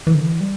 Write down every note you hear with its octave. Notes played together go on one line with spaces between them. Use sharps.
E3
D3
E3
G3